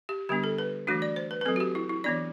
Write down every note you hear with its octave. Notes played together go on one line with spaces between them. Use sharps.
G4
D3 G3 B3 D4 G4
A4
B4
E3 A3 D4 F#4
D5
C5
B4
B4
F#3 C4 A4
F#4
G4
E4
E4
E3 B3 D4 D5